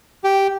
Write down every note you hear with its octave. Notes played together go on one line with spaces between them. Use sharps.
G4